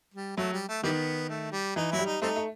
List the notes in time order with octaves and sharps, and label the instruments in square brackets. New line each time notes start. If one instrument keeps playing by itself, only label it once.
[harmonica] G3
[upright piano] F#3 [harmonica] A3
[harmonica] G3
A3
[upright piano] D#3 [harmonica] E3 G3 B3
[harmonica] A3
G3
[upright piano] E3 [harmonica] D#4
[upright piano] F#3 [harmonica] E4
[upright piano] G3
[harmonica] D#4
[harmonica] G3 C4 D#4 [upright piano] A3
[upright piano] A3